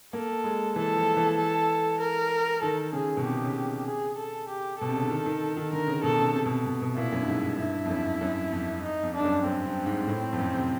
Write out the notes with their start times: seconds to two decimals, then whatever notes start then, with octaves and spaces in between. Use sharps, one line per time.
0.13 A#3 A4
0.44 G#3
0.76 E3 A4
0.96 F3
1.17 E3
1.37 A4
2.00 A#4
2.62 D#3 A4
2.93 C#3 G#4
3.17 B2
3.24 C3 G4
3.44 C#3
3.86 G#4
4.17 A4
4.48 G4
4.79 B2 A4
4.89 C3
4.96 C#3
5.03 D3
5.10 D#3
5.26 D#3
5.57 D#3
5.72 D3 A#4
5.88 C#3
6.03 B2 A4
6.19 C#3
6.35 C3
6.46 B2
6.50 C3
6.66 B2
6.81 B2
6.97 A#2 E4
7.12 F#2
7.20 G2
7.27 G#2
7.58 G2 E4
7.85 F2
7.90 F#2
8.21 F#2
8.52 F2
8.83 D#4
9.03 F2
9.14 D4
9.19 G2
9.24 F#2
9.45 F#2 C4
9.65 G2
9.86 G#2
10.07 A2
10.33 F2
10.38 F#2
10.54 C3